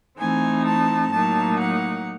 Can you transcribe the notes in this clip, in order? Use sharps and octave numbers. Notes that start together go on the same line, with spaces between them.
E3 A3 C4 D#4 G#5
A5
A2 F#3 A#3 D#4 A5
F#5